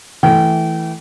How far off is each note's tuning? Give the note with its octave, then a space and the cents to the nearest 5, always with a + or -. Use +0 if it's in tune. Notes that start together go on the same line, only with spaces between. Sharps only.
E3 -5 A3 +0 G5 -30